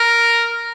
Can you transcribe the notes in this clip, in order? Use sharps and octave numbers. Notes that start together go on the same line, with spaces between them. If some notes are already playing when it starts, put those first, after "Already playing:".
Already playing: A#4